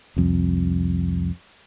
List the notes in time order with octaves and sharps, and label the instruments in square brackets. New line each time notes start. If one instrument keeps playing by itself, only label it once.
[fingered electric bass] C2 F2